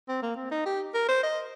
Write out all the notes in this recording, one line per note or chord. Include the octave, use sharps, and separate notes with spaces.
C4
A#3
C4
D#4
G4
A#4
C5
D#5